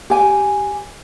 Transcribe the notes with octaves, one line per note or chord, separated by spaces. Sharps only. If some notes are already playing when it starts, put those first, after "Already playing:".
G4 G#5